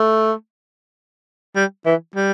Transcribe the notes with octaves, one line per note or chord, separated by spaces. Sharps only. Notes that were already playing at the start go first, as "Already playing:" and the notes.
Already playing: A3
G3
E3
G3